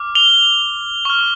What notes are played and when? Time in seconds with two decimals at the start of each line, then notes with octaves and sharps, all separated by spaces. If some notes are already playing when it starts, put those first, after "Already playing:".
Already playing: D6 F6
0.15 F7 G7
1.05 C#6 F6